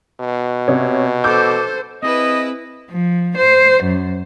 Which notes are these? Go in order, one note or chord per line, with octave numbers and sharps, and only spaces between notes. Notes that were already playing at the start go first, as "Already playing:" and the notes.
B2
C3 C#4
A4 C5 D6 E6 G6
C4 E4 G#4 B4 D#5
F3
C5
F#2